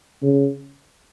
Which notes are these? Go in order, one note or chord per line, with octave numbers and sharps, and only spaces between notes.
C#3